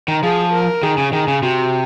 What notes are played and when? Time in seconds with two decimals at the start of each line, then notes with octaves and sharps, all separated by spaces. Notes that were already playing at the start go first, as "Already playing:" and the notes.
0.08 D#3
0.23 F3 G#4
0.53 A#4
0.83 D#3 G#4
0.98 C#3
1.13 D#3 G#4
1.28 C#3
1.42 C3 F#4